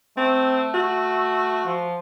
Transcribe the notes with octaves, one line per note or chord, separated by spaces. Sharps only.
A3 C4
F#4
F3